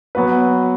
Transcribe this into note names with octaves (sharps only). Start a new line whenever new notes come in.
F#3 B3 F#4 B4